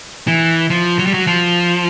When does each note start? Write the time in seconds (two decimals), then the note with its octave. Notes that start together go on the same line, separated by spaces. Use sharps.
0.27 E3
0.70 F3
0.99 F#3
1.07 G3
1.14 F#3
1.27 F3